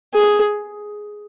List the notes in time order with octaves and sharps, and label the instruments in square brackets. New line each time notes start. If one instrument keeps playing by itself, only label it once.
[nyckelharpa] G#4